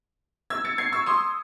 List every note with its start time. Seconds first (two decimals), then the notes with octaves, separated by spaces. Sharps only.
0.50 E6 G#6
0.65 A6 C#7
0.78 G#6 C7
0.92 C#6 E6
1.06 C6 D#6